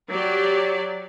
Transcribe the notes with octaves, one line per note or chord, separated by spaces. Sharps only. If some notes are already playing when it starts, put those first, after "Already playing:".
F#3 G4 D5